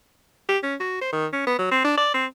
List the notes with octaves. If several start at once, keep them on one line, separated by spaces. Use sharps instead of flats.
G4
C#4
F#4
C5
D#3
C#4
B3
F#3
C4
D4
D5
C4